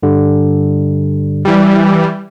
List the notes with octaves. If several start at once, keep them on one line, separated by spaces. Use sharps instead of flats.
G2 D3 G3
E3 G3